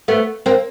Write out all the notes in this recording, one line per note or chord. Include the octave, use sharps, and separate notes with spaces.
A3 B3
A#3 C4